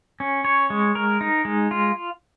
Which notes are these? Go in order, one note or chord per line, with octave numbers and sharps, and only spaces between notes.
C#4
C#5
G#3
A#4
D#4
G#3
F4